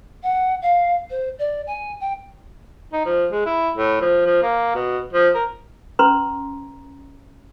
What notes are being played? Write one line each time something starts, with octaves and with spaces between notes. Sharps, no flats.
F#5
F5
C5
D5
G#5
G5
D#4
F3
G#3
E4
A2
F3
F3
A#3
B2
F3
A#4
C#4 B4 A#5 C6